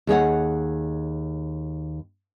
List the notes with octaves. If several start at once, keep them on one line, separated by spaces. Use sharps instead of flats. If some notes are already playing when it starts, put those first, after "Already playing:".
D#2 G#4 C#5 F#5